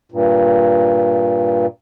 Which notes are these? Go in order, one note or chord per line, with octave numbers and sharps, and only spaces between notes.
G2 A#2